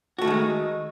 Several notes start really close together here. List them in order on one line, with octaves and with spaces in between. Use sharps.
F#4 A3 D#3 G#3 D#4